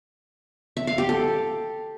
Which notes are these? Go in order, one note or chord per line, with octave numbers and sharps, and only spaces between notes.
E5
F5
G4
A4